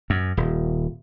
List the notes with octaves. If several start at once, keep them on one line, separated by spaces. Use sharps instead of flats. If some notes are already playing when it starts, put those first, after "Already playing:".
F#2
D#1